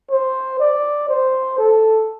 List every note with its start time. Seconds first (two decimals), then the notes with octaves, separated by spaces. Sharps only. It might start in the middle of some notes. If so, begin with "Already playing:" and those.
0.11 C5
0.60 D5
1.09 C5
1.58 A4